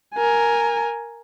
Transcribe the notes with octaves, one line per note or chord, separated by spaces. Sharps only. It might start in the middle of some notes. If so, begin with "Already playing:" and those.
A#4 G#5